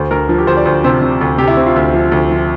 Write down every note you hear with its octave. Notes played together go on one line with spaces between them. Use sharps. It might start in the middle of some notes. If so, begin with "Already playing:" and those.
Already playing: D2 C5
D2 A#4
F3
G4
D2 C5
D5
D2 C5
C3 C5
C3
D2
C3 G4
E4
C3 C4
F4
D2
F3
D2
F3